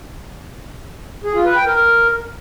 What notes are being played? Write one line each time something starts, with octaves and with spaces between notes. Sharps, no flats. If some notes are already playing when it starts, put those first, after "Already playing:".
G#4
F4
B4
G5
A#4